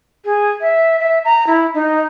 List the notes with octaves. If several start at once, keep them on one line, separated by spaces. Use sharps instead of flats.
G#4
E5
E5
A#5
E4
D#4